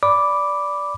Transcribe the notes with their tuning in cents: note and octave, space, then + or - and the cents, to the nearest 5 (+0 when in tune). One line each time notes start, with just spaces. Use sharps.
D5 -15 B5 +0 D6 +0